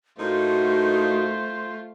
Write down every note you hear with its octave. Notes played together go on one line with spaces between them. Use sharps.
A2 A3 A#3 D#4 F4 F#4 C5